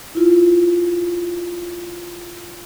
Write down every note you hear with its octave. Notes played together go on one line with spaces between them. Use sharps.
E4 F4